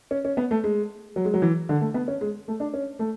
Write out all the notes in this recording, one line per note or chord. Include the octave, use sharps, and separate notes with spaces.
C#4
C#4
B3
A3
G#3
F#3
G#3
F#3
E3
D3
A3
B3
C#4
G#3
A3
D4
C#4
A3